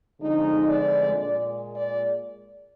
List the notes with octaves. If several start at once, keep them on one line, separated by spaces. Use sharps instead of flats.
F2 D3 G#3 D#4
D5
A#2 G#3 D5
D5